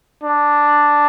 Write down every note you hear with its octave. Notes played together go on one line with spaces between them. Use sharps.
D4